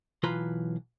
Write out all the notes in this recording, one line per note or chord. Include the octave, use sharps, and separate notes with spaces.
B1 E3 F4 B4 A#5 C6